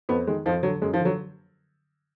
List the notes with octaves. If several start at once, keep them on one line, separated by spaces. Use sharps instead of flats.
F2 B3
D#3 G#3
F2 F3
D3 F#3
F#2 G#3
F3
D3
F#3